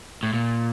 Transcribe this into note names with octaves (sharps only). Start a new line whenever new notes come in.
A2
A#2